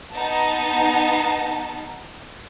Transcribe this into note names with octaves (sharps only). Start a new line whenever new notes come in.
B3 D#4 A5